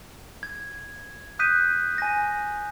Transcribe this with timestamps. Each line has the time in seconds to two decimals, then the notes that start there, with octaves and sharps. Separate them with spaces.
0.43 G#6
1.39 D#6 F#6 G6 B6 D#7
1.98 G#5 A#6